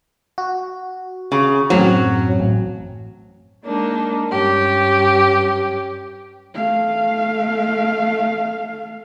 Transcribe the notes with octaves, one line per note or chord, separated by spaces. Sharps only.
F#4
C#3
F#2 A2 F#3 C4
A1
G#3 A#3 D4 D#4
G2 C#4 G4
A3 F5